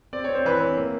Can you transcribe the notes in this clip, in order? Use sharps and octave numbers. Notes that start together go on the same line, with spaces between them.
C4 D5
C4 C#5
C5
E3 B4 C#5
C4
A#3